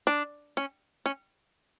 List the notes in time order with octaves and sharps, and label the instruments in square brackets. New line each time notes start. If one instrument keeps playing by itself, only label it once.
[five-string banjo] D4
C#4
C#4